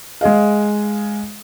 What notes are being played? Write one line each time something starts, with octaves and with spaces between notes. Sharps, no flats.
G#3 G#4 D#5 F5